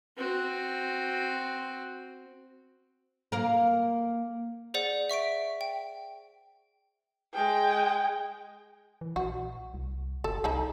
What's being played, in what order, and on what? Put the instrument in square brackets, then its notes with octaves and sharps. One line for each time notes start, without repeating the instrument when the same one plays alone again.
[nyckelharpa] C4 F#4
[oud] A#3 A#4
[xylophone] G#4 C5 D5 F#5
E5 C#6 B6 D7
G5
[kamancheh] G#3 G5
[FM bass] E3
[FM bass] A#1 [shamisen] F#4
[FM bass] C2
[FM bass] F#1 [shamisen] A4
[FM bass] C2 [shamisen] D#4 G#4 A4